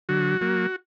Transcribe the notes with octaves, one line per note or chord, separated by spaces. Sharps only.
D3 F#3 F#4
F#3 A#3